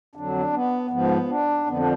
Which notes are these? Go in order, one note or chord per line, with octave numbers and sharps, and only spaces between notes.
F2 D3 F#3 D4
B3
G#2 F3 B3
D4
F2 D3 F3 B3
D4